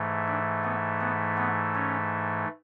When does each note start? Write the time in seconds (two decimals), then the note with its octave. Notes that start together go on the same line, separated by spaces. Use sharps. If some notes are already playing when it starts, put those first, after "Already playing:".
Already playing: G#2 E3 A3
0.28 D4
0.64 B3
1.01 B3
1.38 B3
1.75 C#4